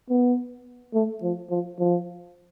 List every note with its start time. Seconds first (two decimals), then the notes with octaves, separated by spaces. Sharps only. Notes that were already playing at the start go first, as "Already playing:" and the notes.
0.09 B3
0.94 A3
1.22 F3
1.50 F3
1.79 F3